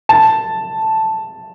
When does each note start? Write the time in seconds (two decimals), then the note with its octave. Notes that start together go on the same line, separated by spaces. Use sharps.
0.09 A5